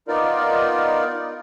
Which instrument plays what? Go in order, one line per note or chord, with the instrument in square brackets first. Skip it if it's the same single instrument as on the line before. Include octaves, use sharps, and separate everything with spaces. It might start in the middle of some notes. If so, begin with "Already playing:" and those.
[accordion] B3 D#4 F4 A#4 D5